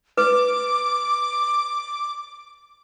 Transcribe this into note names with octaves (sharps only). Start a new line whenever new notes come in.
B4 D6